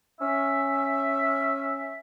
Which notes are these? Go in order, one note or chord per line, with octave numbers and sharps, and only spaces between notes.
C#4 E5